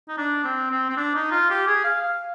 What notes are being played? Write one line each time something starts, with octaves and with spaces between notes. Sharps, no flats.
D#4
D4
C4
C4
C4
D4
D#4
F4
G4
G#4
F5
F5